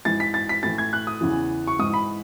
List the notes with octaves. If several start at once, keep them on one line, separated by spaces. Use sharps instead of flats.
G#2 E3 A6
B6
A6
B6
A2 E3 A6
G#6
F#6
D#6
E2 C#3 E3
C#6
G#2 E3 D#6
B5